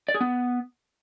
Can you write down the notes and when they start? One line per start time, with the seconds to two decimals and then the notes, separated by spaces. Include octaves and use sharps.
0.08 D5
0.15 G#4
0.21 B3